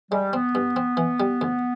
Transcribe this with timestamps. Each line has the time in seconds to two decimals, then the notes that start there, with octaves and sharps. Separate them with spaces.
0.12 G3 G#3
0.33 B3 C4
0.55 G2
0.76 C4
0.97 E3
1.20 G3
1.41 D2